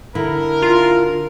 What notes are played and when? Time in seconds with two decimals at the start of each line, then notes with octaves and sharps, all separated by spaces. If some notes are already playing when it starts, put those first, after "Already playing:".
0.15 D3 E4 A#4
0.62 F4